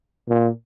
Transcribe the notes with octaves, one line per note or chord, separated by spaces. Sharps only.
A#2